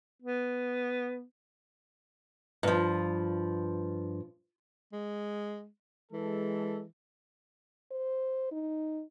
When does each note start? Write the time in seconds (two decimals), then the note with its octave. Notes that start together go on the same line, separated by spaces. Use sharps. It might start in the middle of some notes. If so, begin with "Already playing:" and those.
0.22 B3
2.63 G2 F3
4.93 G#3
6.12 E3 G#3 A4
7.91 C5
8.52 D#4